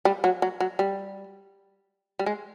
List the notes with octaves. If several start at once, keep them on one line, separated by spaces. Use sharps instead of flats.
G3
F#3
F#3
F#3
G3
G3
G#3